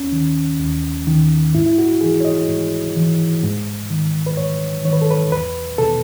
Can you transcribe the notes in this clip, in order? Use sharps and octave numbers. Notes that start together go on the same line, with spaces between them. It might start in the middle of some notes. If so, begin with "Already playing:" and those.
Already playing: D#2 C#4
D#3
D#2
D#3
G#2 E4
E4
F#4
E3 G#4
C#5
D#5
G#2
E3
G#2
D#3
B4
G#2 C#5
D#3 C#5
B4
A4
B4
E2 B4
B2 A4